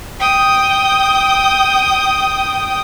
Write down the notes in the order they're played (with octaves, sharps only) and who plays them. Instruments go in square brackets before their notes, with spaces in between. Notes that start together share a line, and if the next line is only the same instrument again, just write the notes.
[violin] G5 D#6